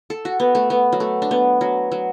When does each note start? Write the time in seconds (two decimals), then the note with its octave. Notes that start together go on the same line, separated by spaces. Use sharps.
0.10 A4
0.25 F#4
0.40 B3
0.55 A3
0.70 B3
0.92 F#3
1.00 A3
1.22 D4
1.31 B3
1.61 F#3
1.92 F#3